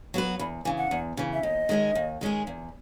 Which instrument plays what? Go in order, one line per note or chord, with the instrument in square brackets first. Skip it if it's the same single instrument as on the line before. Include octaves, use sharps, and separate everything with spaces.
[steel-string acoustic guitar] F#3 B3 F#4 B4
[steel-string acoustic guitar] E2 [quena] B5
[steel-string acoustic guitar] C#3 E3 [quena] G#5
[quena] F#5
[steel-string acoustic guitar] E2
C#3 E3
[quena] E5
[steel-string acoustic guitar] D#2 [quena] D#5
[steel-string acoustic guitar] D#3 G#3 C#4 G#4
D#2
D#3 G#3 C#4 G#4
E2